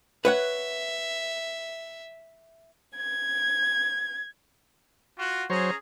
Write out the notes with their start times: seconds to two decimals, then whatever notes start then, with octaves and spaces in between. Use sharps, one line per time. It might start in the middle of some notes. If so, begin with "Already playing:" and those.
0.25 B4 C#5 E5 F#5
2.96 G#6
5.18 F4 F#4
5.50 F#3 C#4 G#4 C5 C#5 A#5